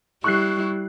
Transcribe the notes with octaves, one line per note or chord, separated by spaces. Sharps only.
G3 E4 C#6 F#6 C7